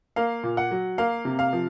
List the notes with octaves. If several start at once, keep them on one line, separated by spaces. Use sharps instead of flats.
A#3 F5
A#2
F#5
F#3
A#3 F5
C3
F5
F3